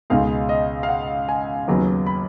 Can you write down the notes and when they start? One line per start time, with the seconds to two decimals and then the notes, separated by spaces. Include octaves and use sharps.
0.10 C#2 B2 G#3 D#4 F5
0.49 D#5
0.83 F5
0.89 F#5
1.29 G#5
1.68 D#2 C#3 F#3 B3
2.06 B5